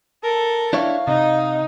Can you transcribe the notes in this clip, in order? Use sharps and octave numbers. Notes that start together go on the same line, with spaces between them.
A4 A#4
D4 E4 C#5 F5
C3 D#4